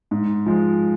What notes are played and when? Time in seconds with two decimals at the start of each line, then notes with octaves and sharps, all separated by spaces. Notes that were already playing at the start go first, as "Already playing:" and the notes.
0.11 G#2
0.46 F3 G#3